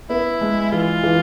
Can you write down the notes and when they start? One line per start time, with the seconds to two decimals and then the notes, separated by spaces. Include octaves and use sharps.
0.09 B3 E4
0.41 G#3
0.72 E3 F4
1.04 E3